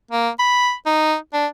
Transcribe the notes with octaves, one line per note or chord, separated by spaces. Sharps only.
A#3
B5
D#4
D4